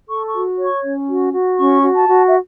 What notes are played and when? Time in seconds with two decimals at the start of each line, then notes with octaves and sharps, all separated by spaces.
0.08 A4 C#6
0.28 C#6
0.33 F#4
0.58 C#5
0.65 C#6
0.83 C#4
1.08 F#4
1.33 F#4
1.58 C#4 C#6
1.83 F#4
1.95 A5
2.08 F#4
2.28 E5